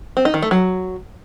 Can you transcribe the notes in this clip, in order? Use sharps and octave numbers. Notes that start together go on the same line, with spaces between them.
C4
D#4
D#3
A3
F#3